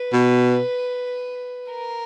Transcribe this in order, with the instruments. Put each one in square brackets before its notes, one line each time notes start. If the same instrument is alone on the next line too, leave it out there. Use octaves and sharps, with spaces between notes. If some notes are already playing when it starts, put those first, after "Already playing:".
Already playing: [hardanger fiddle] B4
[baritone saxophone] B2
[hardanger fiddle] A#4